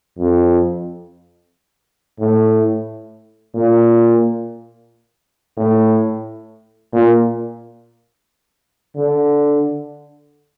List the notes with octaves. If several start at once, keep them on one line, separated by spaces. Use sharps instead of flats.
F2
A2
A#2
A2
A#2
D3